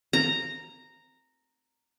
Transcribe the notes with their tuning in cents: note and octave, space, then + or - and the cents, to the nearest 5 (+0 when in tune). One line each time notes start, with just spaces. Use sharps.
A#5 -10